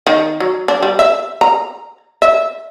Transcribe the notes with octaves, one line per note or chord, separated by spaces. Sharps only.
D#3
F#3
D4
G3
E5
A#5
E5